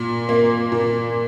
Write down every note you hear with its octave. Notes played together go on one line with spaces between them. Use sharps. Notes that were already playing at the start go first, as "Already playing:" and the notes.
Already playing: A#2
A#3
A#2